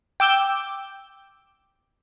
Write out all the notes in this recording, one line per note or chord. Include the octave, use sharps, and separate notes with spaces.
G5 D6 E6 G6